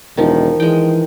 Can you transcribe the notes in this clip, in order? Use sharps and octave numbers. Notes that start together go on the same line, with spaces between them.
E1 D#3 F3
E3 G#3 G5